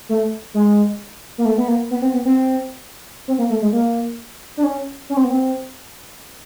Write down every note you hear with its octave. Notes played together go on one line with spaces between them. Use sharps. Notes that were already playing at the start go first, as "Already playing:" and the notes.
A3
G#3
A#3
A3
B3
A#3
B3
C4
B3
C4
C4
A#3
A3
G#3
A#3
D4
C#4
C#4
C4
B3
C4